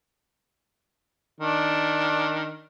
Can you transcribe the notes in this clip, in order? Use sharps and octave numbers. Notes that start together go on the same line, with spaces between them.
D#3 D4